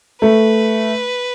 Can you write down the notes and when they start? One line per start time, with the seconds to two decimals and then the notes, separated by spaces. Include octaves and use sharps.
0.22 A3 B4